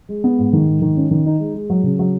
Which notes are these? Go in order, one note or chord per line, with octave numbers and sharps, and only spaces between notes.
G#3
B3
G#2
D#3
G#2
D#3
C#4
D#3
D#4
G#3
G#3
F#3
C#3
F#3